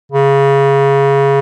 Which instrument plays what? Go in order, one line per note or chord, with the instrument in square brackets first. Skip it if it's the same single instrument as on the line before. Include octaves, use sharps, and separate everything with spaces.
[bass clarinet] C#3